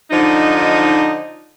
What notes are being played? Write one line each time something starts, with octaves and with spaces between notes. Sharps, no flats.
D3 F3 D#4